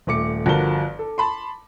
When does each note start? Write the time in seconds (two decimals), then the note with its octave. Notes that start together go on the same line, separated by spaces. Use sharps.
0.07 D#1 A3 D6 C#7
0.46 G1 F3 F#4 A#4 A5 G7
0.99 A4
1.18 A5 B5 C6